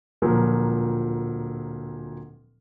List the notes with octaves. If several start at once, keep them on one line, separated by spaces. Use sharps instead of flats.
D1 A#2 F3 F#3 A#4 B4